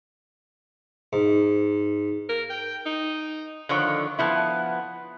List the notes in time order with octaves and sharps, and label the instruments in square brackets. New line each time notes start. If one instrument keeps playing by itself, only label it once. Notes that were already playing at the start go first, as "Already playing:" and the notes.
[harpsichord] G#2
[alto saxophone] A#4
G5
D#4
[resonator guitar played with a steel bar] D3 D#3 F3 C#5
F3 B3 E4